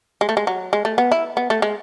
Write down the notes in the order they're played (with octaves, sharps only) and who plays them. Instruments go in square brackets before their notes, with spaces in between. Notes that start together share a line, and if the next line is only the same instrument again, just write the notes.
[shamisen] G#3
A3
G#3
F#3
G#3
A3
B3
E4
B3
A3
G#3